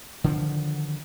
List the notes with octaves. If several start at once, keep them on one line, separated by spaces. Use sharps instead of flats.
D3 D#3 F3